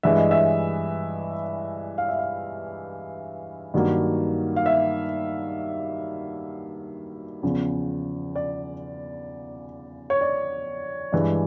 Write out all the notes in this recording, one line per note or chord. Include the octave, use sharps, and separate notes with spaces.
G2 E3 G#3 E5
D#5
E5
F5
E5
F5
G2 D#3 F#3 A#3
F5
E5
E2 C#3 F3
D5
C#5
D5
G2 E3 G#3